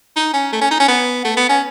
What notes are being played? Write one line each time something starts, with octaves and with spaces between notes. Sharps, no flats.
D#4
C#4
A3
C#4
D#4
C#4
B3
A3
B3
C#4